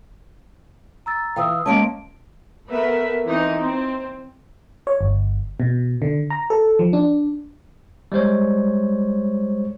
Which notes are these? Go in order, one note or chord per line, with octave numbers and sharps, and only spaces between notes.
A#5 E6 A6
E3 F5 G5 D#6 E6
G#3 A#3 C#4 A5 D7
A3 B3 A#4 B4 E5
E3 C4 D#4
C4
C#5
G1
B2
D3
A#5
A4
F3
D4
G3 G#3 C5 C#5